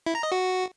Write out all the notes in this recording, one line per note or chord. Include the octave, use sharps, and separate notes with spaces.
E4
A#5
D#5
F#4